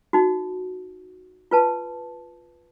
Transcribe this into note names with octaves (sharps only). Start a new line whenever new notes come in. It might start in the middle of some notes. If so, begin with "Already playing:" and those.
D#4 F#4
F4 B4 A5